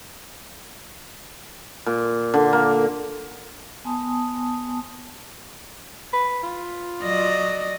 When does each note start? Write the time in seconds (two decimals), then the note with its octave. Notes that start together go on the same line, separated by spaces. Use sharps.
1.86 A#2
2.34 D3
2.53 A#3
3.84 B3 G#5 A5 C6 D#6
6.13 B4
6.43 F4
7.02 F#3 D5 D#5